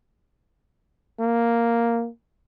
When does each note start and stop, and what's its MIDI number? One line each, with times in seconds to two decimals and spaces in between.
1.20 2.08 58